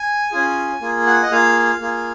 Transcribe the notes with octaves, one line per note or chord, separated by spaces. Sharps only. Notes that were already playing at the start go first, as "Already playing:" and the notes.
Already playing: G#5
C#4 F4 G#4
A#3 F4 G#4
F#5
D#5
A#3 F4 G#4 F5
A#3 F4 G#4